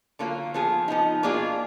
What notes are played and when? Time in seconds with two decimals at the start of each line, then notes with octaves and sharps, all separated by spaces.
0.19 D3 F#3 A#3 F4
0.54 F3 B3 F4 G#4
0.88 F3 B3 D#4
1.23 B2 A#3 D4 F4 G#4